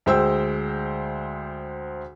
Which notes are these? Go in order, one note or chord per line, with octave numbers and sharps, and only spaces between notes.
D2 G#3 C5 G5 E6